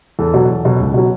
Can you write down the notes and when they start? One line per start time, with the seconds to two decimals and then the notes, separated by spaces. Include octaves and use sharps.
0.19 E2 A4
0.34 B2 F#3
0.50 E2
0.65 B2 F#3
0.80 C#2
0.94 B2 F#3